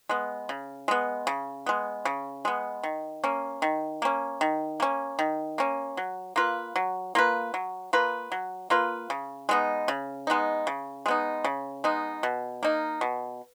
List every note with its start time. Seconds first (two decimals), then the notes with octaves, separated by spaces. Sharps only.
0.09 G#3 B3
0.49 C#3
0.88 G#3 B3
1.27 C#3
1.66 G#3 B3
2.05 C#3
2.45 G#3 B3
2.83 D#3
3.24 A#3 C#4
3.62 D#3
4.02 A#3 C#4
4.41 D#3
4.80 A#3 C#4
5.19 D#3
5.58 A#3 C#4
5.97 F#3
6.36 A#3 F4 B4
6.76 F#3
7.15 A#3 F4 B4
7.54 F#3
7.93 A#3 F4 B4
8.32 F#3
8.70 A#3 F4 B4
9.10 C#3
9.49 G#3 B3 D#4
9.88 C#3
10.27 G#3 B3 D#4
10.67 C#3
11.06 G#3 B3 D#4
11.44 C#3
11.84 G#3 B3 D#4
12.23 B2
12.63 A#3 D#4
13.01 B2